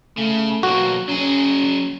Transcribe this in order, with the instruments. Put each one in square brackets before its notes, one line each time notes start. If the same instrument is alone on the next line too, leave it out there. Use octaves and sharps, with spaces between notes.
[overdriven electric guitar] C#3 [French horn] A3
[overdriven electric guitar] B1 A#3 [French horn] F#3 [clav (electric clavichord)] F#4
[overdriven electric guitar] F#3 G#4 [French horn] C#4